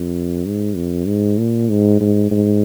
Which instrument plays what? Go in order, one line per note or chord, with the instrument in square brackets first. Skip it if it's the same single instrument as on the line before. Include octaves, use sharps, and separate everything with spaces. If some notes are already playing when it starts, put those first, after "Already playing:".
Already playing: [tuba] F2
G#2
F2
G#2
A#2
G#2
G#2
G#2